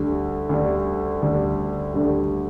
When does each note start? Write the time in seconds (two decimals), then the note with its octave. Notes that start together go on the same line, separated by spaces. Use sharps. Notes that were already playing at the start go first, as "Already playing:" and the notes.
Already playing: D2 D3 G3
0.49 D2 D3 G3
1.22 D2 D3 G3
1.94 D2 D3 G3